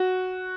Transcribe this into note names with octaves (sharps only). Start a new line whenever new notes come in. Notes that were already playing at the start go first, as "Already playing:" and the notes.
Already playing: F#4